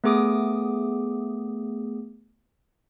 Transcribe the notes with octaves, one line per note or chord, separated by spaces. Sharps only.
A3 B3 G#4 D6 D#6